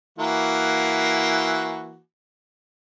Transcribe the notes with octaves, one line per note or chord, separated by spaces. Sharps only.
E3 A#3 F#4